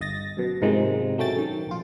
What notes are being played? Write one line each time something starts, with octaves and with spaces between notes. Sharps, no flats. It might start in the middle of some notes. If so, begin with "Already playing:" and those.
G1 D#5 A6 A#6
F#2 B2
G#2 C3 D#3 F3 G#3
B1 F#3 A3 C#4 G5 A6
F#2 D#3
A#1 F4